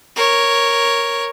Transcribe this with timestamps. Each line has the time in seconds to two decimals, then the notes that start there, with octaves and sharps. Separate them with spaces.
0.16 A#4 C#5